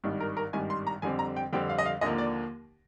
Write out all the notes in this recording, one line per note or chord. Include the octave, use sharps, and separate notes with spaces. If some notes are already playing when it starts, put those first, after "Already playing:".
G#1 G2 D#3 G3
A#4
A#4
G#1 G2 D#3 G3 G#5
C6
A#5
F2 D3 G3 C4 G#5
A#5
G5
F2 D3 G3 C4 G5
F5
D#5
F5
D#2 D3 F3 A#3 D#5
D5